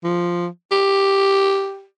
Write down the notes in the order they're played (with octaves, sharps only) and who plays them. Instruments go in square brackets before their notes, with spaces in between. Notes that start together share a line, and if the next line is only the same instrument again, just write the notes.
[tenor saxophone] F3
G4